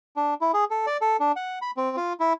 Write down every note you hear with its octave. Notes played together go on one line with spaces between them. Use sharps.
D4
E4
G#4
A4
D5
A4
D4
F#5
B5
C4
F4
E4